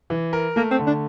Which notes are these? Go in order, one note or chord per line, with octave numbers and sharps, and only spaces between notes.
E3
A#4
A3 A#3
C4
D3
D4